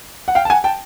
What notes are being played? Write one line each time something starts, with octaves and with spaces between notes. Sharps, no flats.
F#5
F5 G5
A5
F#5 G#5
G5 A5